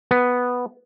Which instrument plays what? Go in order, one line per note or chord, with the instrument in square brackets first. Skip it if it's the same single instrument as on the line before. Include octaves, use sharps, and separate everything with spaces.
[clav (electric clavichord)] B3